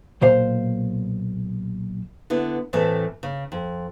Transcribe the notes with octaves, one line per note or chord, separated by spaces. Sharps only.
B1 A#2 C5 F5
D3 B3 E4
A2 E3 A3 C4 A4 A5
C#3
F2